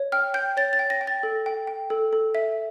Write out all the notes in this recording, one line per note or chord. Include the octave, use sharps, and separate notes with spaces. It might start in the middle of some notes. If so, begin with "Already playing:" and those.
Already playing: C#5
G5 F6
G5 G6
C#5 A6
A6
G5
A#6
G5
A6
A4
G5
G5
A4
A4
E5